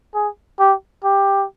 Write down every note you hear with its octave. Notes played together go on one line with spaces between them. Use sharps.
G#4
G4
G4